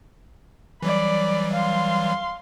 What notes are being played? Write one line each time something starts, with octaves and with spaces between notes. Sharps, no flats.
E3 F#3 G3 D5 B5
F5 C6